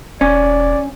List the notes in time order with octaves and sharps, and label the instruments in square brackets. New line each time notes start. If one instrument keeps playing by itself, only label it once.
[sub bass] E1 [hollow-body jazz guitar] C#4 [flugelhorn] D5